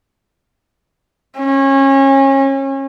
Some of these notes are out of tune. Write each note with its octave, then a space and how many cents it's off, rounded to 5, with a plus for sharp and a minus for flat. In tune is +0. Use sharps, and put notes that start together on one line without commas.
C#4 -30